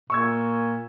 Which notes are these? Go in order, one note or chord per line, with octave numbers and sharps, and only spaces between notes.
A#2 C#6 E6 G#6